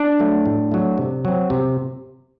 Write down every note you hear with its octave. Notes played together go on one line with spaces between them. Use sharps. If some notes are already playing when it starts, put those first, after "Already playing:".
Already playing: D4
F#3 A3
A2
F#3 A3
C3
F#3 C4
C3